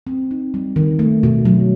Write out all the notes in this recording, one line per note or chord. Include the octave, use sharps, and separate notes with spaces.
C4
D#4
G3
D#3
A3
B2
F#3